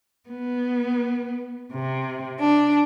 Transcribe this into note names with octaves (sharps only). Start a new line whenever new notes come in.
B3
C3
D4